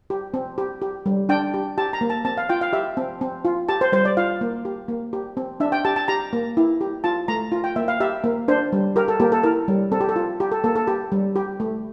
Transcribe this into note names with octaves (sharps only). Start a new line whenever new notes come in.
G4
C4
G4
G4
G3
D4 G5
G4
G4 A5
A#5
A#3
A5
C4 A5
F5
F4 G5
F5
G4 E5
C4
C4
F4
G4 A5
C5
G3 C5
D5
F4 F5
A#3
G4
A#3
G4
C4
D4 E5
G5
G4 A5
A5
G4 A#5
A#3
E4
G4
F4 A5
A3 A#5
F4
G5
A#3 E5
F5
G4 E5
A#3
D4 C5
G3
G4 A#4
A4
A#3 G4
A4
E4 A#4
G3
C4 A4
G4
A4
F4
G4
A4
A#3 A4
A4
G4
G3
G4
A3